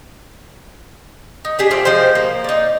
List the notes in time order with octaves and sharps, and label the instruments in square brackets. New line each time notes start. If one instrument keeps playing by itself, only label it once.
[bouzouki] D#4
D4 G4 G#4
G3 A3 C4 F4
F3 G#3 G4 C5
A#3
D#4 D5